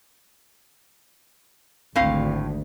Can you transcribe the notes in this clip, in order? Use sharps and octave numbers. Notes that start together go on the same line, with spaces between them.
G#1 D2 A2 C4 F5